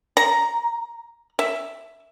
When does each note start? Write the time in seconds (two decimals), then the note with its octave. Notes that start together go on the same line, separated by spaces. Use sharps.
0.17 A#5
1.39 E5